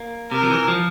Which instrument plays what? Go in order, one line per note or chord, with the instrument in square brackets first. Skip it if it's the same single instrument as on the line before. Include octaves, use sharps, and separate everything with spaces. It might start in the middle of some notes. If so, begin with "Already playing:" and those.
Already playing: [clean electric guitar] A#3
[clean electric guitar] C3 [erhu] A#4
[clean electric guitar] F3
E3
F3